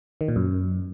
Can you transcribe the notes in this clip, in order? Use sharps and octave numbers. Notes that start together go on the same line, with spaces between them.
D#3
A#2
F#2